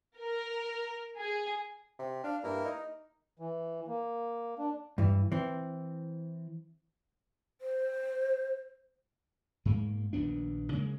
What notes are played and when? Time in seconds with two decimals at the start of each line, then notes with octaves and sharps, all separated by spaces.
0.18 A#4
1.19 G#4
1.99 C3
2.24 D4 F5
2.43 G2 A#3 E4 A#4
2.64 D#4
3.39 E3
3.88 A#3
4.59 D4
4.98 G2 E3
5.32 E3 C4
7.61 C5
9.65 G#2 G#3 A#3
10.13 A#1 D#2 B3 D4
10.73 C#3 G#3 A#3